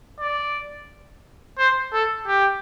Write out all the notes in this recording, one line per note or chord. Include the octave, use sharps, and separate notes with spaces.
D5
C5
A4
G4